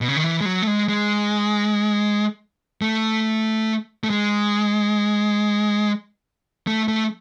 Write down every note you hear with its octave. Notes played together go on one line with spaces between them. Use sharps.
B2
C#3
D#3
E3
G#3
F#3
A3
G#3
G#3
A3
A3
G#3
A3
A3